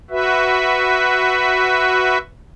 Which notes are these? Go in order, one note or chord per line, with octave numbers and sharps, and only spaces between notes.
F#4 B4 E5